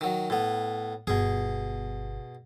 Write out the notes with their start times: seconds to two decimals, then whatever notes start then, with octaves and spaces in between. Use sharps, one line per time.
0.01 D#3 F#3
0.30 A2 B3
1.07 G1 B2 G#4